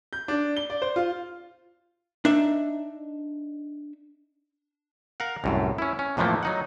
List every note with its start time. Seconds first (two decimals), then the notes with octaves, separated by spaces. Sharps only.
0.13 G6
0.28 D4
0.57 G7
0.70 D5
0.82 C5
0.96 F4
2.25 D4 D#4 E5
5.20 A#4 F5 F#5
5.44 C2 F#2 A2
5.78 C#4 E4
5.99 C#4
6.17 F2 A2 E3 F3 A3 A#3
6.43 F#3 D#4 F#5